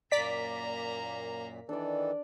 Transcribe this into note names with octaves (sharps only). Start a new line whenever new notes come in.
F#2 A#2 A#3 D5 A#5 B6
D#3 E3 D4 A4 D5